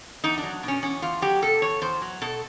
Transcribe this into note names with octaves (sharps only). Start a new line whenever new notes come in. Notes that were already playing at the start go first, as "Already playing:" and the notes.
E2 D#4
D4
F#3
B2
C#4
E2 C#4
E2 F4
F#3 G4
B2 A4
E2 C#5
E2 C5
F#3
B2 A4